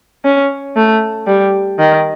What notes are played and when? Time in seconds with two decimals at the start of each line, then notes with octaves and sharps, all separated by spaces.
0.24 C#4
0.76 A3
1.27 G3
1.79 D#3